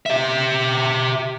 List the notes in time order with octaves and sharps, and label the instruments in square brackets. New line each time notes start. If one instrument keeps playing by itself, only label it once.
[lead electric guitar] G4 E5